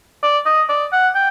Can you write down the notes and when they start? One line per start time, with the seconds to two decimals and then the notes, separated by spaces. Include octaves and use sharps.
0.23 D5
0.46 D#5
0.69 D5
0.93 F#5
1.15 G5